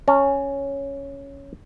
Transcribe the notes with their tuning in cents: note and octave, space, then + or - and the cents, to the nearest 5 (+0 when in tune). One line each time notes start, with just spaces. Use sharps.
C#4 +0 C#5 +0 A5 +45